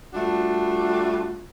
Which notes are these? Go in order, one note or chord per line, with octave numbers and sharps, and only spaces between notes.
G3 A3 D4 F4 F#4